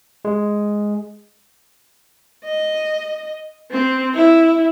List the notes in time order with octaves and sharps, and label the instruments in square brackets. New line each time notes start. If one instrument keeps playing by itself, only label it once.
[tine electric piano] G#3
[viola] D#5
C4
E4